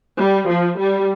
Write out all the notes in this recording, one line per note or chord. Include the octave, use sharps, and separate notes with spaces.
G3
F3
G3